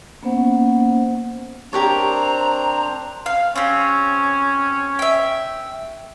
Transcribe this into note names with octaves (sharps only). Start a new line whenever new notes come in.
A#3 B3 C#4 C5 F#5
C4 D4 G4 A#4 C5 C#5 A#5
F5
C4 C#4 G4
E5 G5